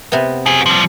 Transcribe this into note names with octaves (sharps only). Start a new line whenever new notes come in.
C3 B3
F#4 G#4 C6
F3 G3